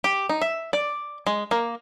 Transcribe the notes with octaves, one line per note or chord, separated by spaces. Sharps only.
G4
D#4
E5
D5
G#3
A#3